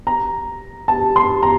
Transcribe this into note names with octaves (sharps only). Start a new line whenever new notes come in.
A#5
A5
C6
A#5